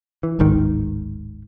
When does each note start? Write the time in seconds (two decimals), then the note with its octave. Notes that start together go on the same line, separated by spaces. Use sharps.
0.23 E3
0.39 D1 G#1 G#2 D#3